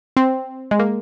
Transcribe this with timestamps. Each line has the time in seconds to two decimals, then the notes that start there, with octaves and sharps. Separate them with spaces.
0.17 C4
0.71 G#3
0.79 A#3